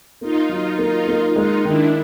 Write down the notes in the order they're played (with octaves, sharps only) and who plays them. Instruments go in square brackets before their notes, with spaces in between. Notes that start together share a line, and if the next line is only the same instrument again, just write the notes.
[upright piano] A#3 [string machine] D#4 F4
[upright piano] F#3 [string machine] D#4 F4
[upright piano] A#3 [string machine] D#4 F4
[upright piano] A#3
[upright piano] G#3 [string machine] D#4 F4
[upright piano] D#3 [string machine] D4 E4